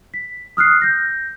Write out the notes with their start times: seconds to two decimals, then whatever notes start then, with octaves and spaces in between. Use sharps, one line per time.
0.14 B6
0.57 D#6 F6 F#6 C7
0.82 G6 A#6